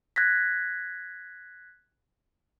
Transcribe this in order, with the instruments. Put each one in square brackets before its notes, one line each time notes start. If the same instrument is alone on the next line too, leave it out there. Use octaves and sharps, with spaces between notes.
[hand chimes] F#6 G#6 A#6 B6